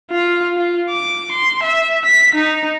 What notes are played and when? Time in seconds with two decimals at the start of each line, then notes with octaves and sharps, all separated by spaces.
0.11 F4
0.57 F4
0.90 D6
1.32 C6
1.63 E5
2.05 B6
2.35 D#4